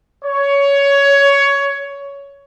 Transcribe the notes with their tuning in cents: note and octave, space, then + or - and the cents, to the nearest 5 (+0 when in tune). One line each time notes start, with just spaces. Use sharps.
C#5 +15